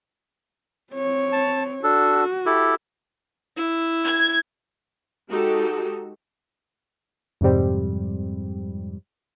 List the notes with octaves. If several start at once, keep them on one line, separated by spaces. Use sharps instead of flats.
C4 C#5
A5
D4 F#4 A4
E4 G4 A4
E4
G#6
G#3 D#4 F#4 G4 A4
F2 G#2 C3 G3 C4